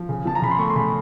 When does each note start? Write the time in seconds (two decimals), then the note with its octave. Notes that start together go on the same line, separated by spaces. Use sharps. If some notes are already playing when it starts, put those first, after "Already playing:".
Already playing: F3
0.09 C#3
0.25 F3 A5
0.35 A#5
0.42 C#3 B5
0.51 C6
0.59 A3 C#6
0.70 C6
0.76 C#3 B5